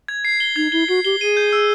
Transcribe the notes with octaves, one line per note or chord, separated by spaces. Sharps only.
G#6
C7
G7
D#4 G#6
E4 G7
F#4 C7
G4 G7
G#4 D#7
G6
E6